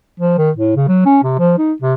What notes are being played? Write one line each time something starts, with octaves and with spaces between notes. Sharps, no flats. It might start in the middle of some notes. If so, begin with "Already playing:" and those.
F3
D#3
A2
C#3
F#3
C#4
C3
F3
D#4
C3